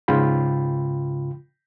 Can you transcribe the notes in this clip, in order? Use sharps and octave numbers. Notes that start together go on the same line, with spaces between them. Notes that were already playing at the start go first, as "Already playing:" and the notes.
G#2 C#3 F4 G5 B5